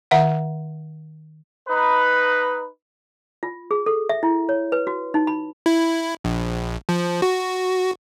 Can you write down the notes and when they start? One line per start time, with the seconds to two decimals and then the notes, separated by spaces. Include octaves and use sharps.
0.11 D#3 E5 F#5
1.68 D#4 B4
3.43 F4
3.71 G#4
3.86 A4
4.09 E5
4.23 E4
4.49 C#5
4.72 B4
4.87 F#4
5.14 D#4
5.27 B5
5.66 E4
6.24 A#1
6.89 F3
7.22 F#4